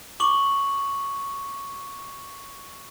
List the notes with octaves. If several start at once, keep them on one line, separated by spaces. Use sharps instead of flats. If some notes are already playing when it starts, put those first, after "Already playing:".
C#6 D6 F#7